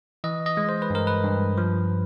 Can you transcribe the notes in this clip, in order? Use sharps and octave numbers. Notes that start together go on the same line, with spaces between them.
E3 D#5
D#5
G#3
C5
B4
G2 A#4
B4
G2
F3